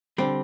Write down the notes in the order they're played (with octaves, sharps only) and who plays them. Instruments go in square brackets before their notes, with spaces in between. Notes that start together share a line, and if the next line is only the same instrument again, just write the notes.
[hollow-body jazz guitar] D3 G3 C4